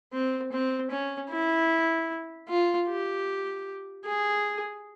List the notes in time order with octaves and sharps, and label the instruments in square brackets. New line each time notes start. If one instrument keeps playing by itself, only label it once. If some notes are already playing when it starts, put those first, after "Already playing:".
[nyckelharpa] C4
C4
C#4
E4
F4
G4
G#4